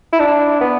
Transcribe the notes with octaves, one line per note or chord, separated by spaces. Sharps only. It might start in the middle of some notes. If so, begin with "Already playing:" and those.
E4
D4
B3